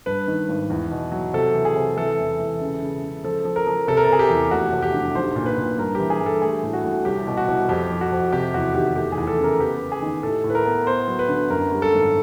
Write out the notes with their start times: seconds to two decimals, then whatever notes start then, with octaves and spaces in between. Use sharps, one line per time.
0.06 G2 B4
0.28 D#3
0.49 G#1
0.70 E2
0.91 B2
1.12 F#3
1.33 C3 A4
1.55 E3
1.65 G#4
1.76 C3
1.97 E3 A4
2.18 E1
2.40 E3
2.61 C#3
2.82 C#3
3.03 C#3
3.24 F3 A4
3.45 F3
3.56 A#4
3.67 F3
3.88 C3 A4
3.97 A#4
4.04 A4
4.09 C3 G#4
4.19 G4
4.30 E2
4.51 F1 F#4
4.73 F1
4.82 G4
4.94 D3
5.15 B1 C5
5.36 A#2
5.46 B4
5.57 A#2
5.78 G2 A#4
5.95 E3 G4
6.10 G#4
6.21 G2
6.26 A4
6.42 A3 G#4
6.63 A2
6.73 F#4
6.84 A1
7.05 C2 G4
7.27 B2
7.37 F#4
7.48 C2
7.69 F2 G4
7.90 F3
8.01 F#4
8.12 F2
8.33 C3 G4
8.54 E2 F#4
8.74 D#3 G4
8.96 F1 G4
9.12 G#4
9.18 E2
9.27 A4
9.38 C#3
9.44 A#4
9.60 B3 G4
9.80 B3
9.92 G#4
10.02 D#3
10.23 A2 A4
10.44 A2
10.50 B4
10.55 A#4
10.65 B3
10.87 B3 C5
11.08 F#3
11.19 B4
11.29 D3
11.50 F#2 A#4
11.72 G3
11.82 A4
11.93 G#1